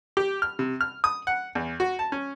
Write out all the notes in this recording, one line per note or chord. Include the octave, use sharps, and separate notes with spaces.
G4
F6
C3
F6
D#6
F#5
E2
F#4
A5
C#4